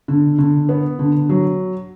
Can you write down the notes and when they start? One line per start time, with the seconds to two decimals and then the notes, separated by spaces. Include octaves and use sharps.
0.08 D3
0.38 D3
0.69 B3
0.99 D3
1.29 F#3